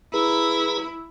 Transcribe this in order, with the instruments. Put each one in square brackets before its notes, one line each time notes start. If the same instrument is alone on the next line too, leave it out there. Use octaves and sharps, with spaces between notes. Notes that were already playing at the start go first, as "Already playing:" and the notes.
[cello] E4 [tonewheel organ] G#4 B4 A#5